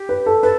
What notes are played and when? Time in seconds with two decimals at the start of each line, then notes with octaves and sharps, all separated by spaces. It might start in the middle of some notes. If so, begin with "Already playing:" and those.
Already playing: G4
0.09 B4
0.26 A4
0.43 A4 B4